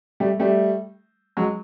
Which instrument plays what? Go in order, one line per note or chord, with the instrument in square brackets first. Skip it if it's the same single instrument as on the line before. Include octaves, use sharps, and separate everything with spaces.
[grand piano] G3 A3
G3 A3
F#3 G#3